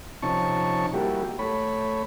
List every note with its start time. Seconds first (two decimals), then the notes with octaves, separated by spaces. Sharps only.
0.23 C3 F3 C#4 D#4 A5 C#6
0.94 G3 A#3 E4 F#4 G4
1.39 A3 C#5 B5